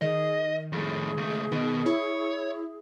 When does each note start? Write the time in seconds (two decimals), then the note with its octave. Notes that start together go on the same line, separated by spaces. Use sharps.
0.01 D#3 G#4 D#5
0.72 F2 A2 G#4
1.17 C#2 A3
1.52 B2 D#3 B3
1.86 E4 C#5